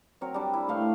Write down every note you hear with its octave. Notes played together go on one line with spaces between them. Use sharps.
F#3 C4 A#4 C#5
G3 D4
E4
A2 A3 F5 C6